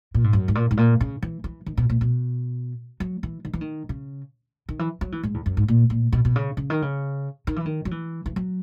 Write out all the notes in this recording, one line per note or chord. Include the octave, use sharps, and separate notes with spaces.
A#2
G#2
F#2
G#2
A#2
G#2
A#2
C#3
E3
E3
D#3
B2
A#2
B2
F#3
E3
D#3
E3
D#3
C#3
D#3
E3
F#3
E3
G#2
E2
F#2
G#2
A#2
A#2
B2
B2
C#3
C#3
D#3
C#3
D#3
E3
D#3
F#3
E3
E3
F#3